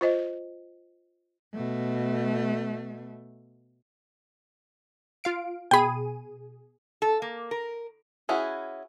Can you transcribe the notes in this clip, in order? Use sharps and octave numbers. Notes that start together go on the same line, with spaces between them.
F4 C5 D#5
B2 A3
F4 F5 D7
B2 G#4 G5 B5 D#7
A4
A#3
A#4
C#4 E4 F#4 G#4